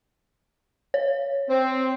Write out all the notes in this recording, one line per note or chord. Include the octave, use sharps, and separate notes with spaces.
C#5
C4